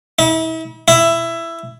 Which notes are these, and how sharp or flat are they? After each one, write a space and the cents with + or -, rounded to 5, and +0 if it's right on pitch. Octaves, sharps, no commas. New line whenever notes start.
E4 -40
E4 +15